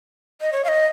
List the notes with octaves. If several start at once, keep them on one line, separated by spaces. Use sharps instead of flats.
D#5
C#5
F5
D#5